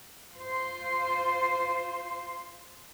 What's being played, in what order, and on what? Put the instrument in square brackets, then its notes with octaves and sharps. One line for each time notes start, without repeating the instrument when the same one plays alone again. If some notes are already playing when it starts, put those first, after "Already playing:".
[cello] F4 C5